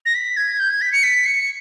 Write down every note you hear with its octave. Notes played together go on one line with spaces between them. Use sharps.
A#6
B6
G#6
G6
G#6
B6
C#7
B6
C#7